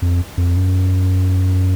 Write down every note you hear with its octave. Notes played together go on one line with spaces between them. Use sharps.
F2
F2
F#2